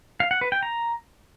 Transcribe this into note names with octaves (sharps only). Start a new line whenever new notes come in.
F5
F#5
B4
G5
A#5